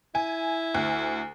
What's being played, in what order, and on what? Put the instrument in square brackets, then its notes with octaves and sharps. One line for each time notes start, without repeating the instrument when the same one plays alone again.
[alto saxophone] E4 [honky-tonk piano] G#5
[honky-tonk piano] D2